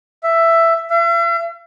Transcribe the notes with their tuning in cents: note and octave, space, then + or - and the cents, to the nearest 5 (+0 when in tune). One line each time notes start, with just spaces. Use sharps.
E5 +10
E5 +45